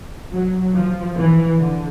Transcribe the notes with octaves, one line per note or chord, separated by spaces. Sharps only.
F#3
F3
E3
D3